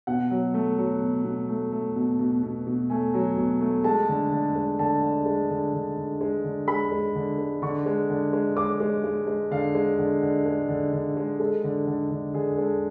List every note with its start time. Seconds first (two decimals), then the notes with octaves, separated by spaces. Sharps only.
0.07 B2 F#5
0.31 F#3
0.54 A3
0.78 F#3
1.02 B2
1.25 B2
1.49 A3
1.72 A3
1.96 B2
2.19 B2
2.43 B2
2.67 B2
2.90 A3 G#5
3.14 F#3
3.38 B2
3.61 A3
3.84 G#3 A5
4.09 D3
4.32 D3
4.55 G#3
4.79 D3 A5
5.02 D3
5.26 G#3
5.50 D3
5.73 D3
5.97 D3
6.21 G#3
6.44 D3
6.68 G#3 B5
6.92 G#3
7.15 D3
7.38 G#3
7.62 D3 C#6
7.86 G#3
8.10 D3
8.33 G#3
8.57 G#3 D6
8.80 G#3
9.04 G#3
9.27 G#3
9.51 D3 F5
9.75 G#3
9.98 D3
10.22 D3
10.46 G#3
10.69 D3
10.93 D3
11.17 G#3
11.40 G#3 A4
11.64 D3
11.87 D3
12.11 D3
12.34 D3 G#4
12.57 G#3 A4